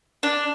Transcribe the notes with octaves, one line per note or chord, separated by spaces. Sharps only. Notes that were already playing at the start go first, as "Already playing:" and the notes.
D4